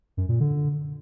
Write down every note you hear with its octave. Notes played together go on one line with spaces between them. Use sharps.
F#2
A#2
D3